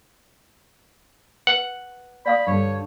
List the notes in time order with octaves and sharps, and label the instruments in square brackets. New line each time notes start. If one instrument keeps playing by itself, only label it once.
[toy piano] B4 [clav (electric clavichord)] F#5
[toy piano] D5 F5 D#6 [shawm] B5
[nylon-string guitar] G2 D3 [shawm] C#5